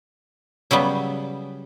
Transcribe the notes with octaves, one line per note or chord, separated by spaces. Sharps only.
C#3 F#3 G3 B3